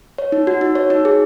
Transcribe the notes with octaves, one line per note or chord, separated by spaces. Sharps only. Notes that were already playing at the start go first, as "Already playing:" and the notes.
C#5
D#4
F#4
D#4
C#5
D#4
G#4